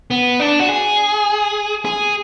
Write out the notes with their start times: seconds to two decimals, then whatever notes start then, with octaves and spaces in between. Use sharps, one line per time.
0.11 B3
0.40 D4
0.60 F#4
0.69 G#4
1.85 G#4